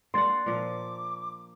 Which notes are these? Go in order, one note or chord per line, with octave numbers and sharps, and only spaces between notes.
A#3 D4 F#5 C6 A6
A#2 F3 D6